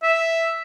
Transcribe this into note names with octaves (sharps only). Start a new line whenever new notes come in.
E5